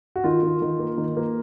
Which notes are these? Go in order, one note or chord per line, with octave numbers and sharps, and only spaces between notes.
F#4
D#3 F4
D#3
D#3
A#3
D#3
A#3